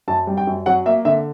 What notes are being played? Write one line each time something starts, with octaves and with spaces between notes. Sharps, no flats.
F#2 A5
G3
G5
F#2
F#3 F#5
A#3 E5
D3 E5